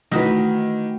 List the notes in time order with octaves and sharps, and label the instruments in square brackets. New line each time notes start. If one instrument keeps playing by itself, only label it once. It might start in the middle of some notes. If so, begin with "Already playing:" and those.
[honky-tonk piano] D#3 E3 [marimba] A3 [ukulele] D#4 F#4 B4